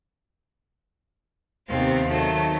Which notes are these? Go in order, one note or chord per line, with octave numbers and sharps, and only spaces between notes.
D#2 C3 B3 C4 F5
D#3 F#3 A3